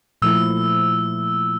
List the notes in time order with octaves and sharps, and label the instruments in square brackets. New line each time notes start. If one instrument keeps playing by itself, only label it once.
[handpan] A#2 F3 A3 E4 [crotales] E6